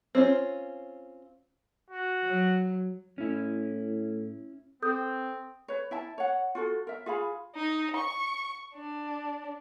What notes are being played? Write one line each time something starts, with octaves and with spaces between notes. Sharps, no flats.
C4 C#4 F4
F#4
F#3
A2 C#4 E4
C4 A4 D#6 G6
B4 C#5
E4 E5 A5
C#5 F#5
F4 F#4 A4
A#4 E5
F4 G#4 F5 B5
D#4
C#6
D4